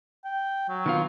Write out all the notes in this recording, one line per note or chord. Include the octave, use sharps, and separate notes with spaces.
G5
F#3
D#3 B3 F4